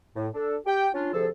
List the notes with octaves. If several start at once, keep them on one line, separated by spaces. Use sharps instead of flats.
A2
D4 A4
G4 G5
C#4 D4 F4
D2 C3 F3 G#4 A4